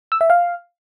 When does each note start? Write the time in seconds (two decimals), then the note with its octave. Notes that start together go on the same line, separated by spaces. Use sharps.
0.12 E6
0.21 E5
0.30 F5